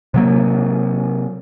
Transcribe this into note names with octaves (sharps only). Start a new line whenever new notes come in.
C3 F#3 A#3